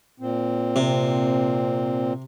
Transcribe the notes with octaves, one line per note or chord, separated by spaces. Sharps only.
A#2 C4
C3